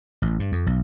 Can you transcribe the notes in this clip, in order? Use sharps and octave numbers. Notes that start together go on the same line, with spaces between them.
A1
G2
F2
B1